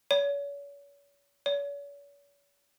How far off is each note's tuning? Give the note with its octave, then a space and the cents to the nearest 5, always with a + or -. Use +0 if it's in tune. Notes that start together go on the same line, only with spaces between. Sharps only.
C#5 +40
C#5 +45